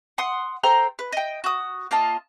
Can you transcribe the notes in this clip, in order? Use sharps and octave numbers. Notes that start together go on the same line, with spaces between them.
F#5 C6 D#6
A4 C5 G5 A#5
B4
D#5 G5
F#4 D#6
A#3 F4 D#5 A5